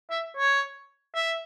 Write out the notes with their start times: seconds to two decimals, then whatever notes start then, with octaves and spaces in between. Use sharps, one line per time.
0.10 E5
0.37 C#5
1.15 E5